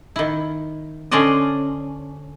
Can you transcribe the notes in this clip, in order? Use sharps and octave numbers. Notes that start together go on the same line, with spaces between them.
D#3 E4
D3 C#4 D4 C5 D5 D#5